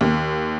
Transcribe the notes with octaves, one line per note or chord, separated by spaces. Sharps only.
D#2